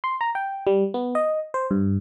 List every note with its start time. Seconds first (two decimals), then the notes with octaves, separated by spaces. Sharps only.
0.04 C6
0.21 A#5
0.35 G5
0.67 G3
0.94 B3
1.15 D#5
1.54 C5
1.71 G2